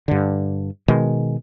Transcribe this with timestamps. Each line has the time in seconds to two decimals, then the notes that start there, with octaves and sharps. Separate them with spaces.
0.08 G2 D3
0.88 B2 D#3 G#3